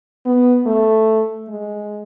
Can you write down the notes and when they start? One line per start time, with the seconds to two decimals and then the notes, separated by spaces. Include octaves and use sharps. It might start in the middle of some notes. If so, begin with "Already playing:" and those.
0.26 B3
0.66 A3
1.48 G#3